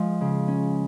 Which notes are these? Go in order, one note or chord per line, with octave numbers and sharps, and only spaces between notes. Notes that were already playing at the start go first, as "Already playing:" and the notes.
Already playing: F3 G#3
C#3
C#4